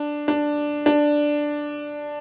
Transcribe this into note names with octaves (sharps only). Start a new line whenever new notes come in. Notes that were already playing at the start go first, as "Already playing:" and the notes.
Already playing: D4
D4
D4